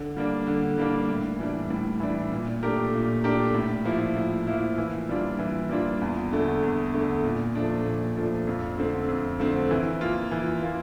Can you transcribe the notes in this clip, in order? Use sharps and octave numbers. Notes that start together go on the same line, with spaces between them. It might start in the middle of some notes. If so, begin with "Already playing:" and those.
Already playing: D3
G3 A#3 D4
D3
G3 A#3 D4
A2
E3 G3 D4
A2
E3 G3 D4
A#2
A3 D4 G4 A#4
A#2
A3 D4 G4 A#4
A2
F3 A#3 E4
A2
F3 A#3 E4
E3
G3 A#3 D4 F4
E3
G3 A#3 D4 F4
E2
D3 A3
E2
D3 A3
A#2
F3 A3 D4
A#2
F3 A3 D4
F2
D3 A3 C4
F2
D3 A3 C4
E3
A#3 F4
E3
A#3 F4